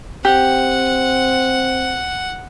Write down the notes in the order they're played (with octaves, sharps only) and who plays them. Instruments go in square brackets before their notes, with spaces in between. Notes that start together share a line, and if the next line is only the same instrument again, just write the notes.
[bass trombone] C4 [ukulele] G4 [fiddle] F#5